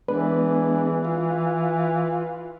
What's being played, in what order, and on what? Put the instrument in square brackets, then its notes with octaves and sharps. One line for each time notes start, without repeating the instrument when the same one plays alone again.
[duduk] E3 [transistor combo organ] G#3 B3 D4 [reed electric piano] B4
[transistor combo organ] F4